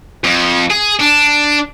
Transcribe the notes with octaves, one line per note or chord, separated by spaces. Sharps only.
F2
G#4
D4